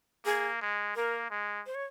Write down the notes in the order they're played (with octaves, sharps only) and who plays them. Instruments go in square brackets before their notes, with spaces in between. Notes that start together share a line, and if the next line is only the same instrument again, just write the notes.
[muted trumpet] A#3 [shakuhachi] G#4
[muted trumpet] G#3
[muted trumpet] A#3 [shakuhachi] A#4
[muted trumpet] G#3
[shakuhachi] C5
C#5